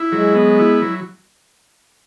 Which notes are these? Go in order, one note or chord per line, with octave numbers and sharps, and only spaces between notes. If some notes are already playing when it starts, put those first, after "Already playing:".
Already playing: E4
F#3 G#3
B3
E4
F#3